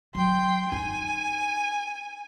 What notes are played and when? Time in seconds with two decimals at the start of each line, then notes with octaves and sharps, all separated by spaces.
0.15 F#3 G5 C6
0.72 D#4 G#5